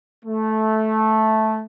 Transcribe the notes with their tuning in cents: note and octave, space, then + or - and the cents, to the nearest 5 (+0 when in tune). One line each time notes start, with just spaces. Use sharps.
A3 -10